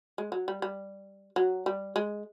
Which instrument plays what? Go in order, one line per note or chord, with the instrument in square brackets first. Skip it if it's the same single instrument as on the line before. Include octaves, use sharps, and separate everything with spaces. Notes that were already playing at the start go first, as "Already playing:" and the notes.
[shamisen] G#3
F#3
G3
G3
F#3
G3
G#3